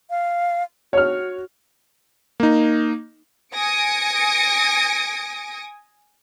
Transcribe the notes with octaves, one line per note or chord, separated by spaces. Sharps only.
F5
F#4 C#5 F6
A#3 D#4
G#5 D#6 A#6 C#7 D7